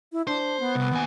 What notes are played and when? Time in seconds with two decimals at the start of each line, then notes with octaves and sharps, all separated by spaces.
0.13 E4
0.27 D4 C5
0.60 B3
0.75 C2
0.91 D#2 G#5